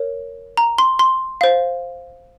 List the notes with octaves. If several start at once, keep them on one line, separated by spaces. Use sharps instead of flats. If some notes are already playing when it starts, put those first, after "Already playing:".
Already playing: A#4 C#5
A#5
C6
C6
C5 F5